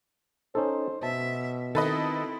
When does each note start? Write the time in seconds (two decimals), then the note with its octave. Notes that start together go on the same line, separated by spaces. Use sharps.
0.55 C#4 D#4 A4 C5
1.03 B2 E5 A5
1.75 D#3 C4 E4 A4 B4 D#5